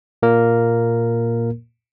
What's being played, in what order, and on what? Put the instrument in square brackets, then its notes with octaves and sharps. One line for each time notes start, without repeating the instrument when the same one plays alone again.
[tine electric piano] A#2 A#3 A#4